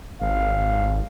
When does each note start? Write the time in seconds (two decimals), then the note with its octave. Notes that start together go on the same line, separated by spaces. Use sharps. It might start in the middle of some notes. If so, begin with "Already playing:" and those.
0.21 G#1 F5